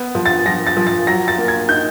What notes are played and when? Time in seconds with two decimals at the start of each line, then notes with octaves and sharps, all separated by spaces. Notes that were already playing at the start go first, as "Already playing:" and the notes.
Already playing: B3
0.15 F3
0.26 A6
0.46 F3 A#6
0.67 A6
0.77 F3
0.87 A6
1.07 F#3 A#6
1.28 A6
1.38 A#3
1.48 G#6
1.69 D#4 G6